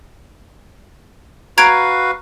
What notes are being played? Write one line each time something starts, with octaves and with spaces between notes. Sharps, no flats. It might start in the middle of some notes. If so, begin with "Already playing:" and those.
F#4 B4 F5 A#5 G#6 D7